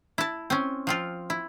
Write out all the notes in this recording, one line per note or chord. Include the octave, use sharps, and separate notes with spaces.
E4 A5
C4 C#4
F3 C4 F4
E4